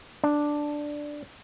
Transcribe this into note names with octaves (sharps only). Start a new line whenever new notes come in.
D4